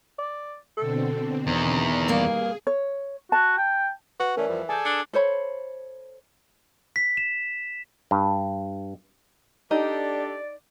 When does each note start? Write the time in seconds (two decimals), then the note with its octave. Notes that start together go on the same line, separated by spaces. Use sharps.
0.19 D5
0.78 B2 D3 C4 A4
1.47 E2 D#3
2.08 G2 A#3 G#4
2.67 C#5
3.32 F#4 A5
3.58 G5
4.20 F#4 B4
4.37 E3 A3 C#4 A#4 D5
4.48 F2 F3 G3
4.69 G#4 A4 D5 G#5 G6
4.85 D4 C#7 G7
5.13 A4 C5 C#5 B5
6.96 B6
7.17 E7
8.11 G2
9.71 D4 D#4 G4 A4 D5